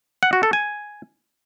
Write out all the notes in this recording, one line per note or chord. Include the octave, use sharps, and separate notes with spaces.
F#5
F#4
A4
G#5